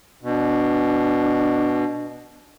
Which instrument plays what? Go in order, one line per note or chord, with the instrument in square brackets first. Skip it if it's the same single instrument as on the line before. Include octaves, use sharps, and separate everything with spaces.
[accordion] B2 [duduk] D4